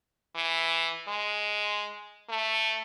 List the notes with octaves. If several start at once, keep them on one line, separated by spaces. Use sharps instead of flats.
E3
G#3
A3